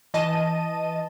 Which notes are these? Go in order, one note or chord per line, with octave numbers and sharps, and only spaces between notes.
E3 D#5 A5 D#7